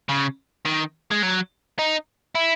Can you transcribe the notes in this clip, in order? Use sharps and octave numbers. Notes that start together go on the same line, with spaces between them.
C#3
D#3
G#3
F#3
D#4
E4